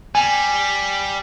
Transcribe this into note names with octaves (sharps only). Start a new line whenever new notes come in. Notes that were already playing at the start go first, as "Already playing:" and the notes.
G3 G#5